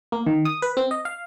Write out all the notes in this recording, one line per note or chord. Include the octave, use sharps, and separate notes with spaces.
A#3
D#3
D#6
B4
C4
D#5
F5